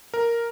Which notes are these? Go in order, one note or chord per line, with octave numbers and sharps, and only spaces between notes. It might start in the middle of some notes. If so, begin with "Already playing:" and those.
A#4